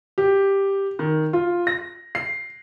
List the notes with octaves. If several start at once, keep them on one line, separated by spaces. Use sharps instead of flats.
G4
D#3
F4
A#6
C7